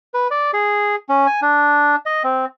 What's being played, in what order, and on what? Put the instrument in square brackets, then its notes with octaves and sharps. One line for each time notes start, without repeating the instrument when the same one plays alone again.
[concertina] B4
D5
G#4
C#4
G#5
D4
D#5
C4